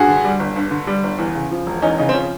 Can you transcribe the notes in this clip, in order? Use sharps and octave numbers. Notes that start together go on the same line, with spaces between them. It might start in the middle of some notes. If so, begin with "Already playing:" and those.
Already playing: G2 F#4 G#4
D3
G3
G1
G2
D3
G3
G1
E2
C#3
F3
E1
E2 C#4 D#4
C#3 C#4 D#4
C4
F3 C#4